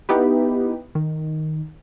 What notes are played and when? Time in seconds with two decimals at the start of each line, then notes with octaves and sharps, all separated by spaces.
0.09 B3 D#4 E4 G4 B4
0.95 D#3